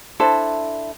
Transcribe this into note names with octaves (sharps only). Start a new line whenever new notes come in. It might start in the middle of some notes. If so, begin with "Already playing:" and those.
D4 E4 A4 C5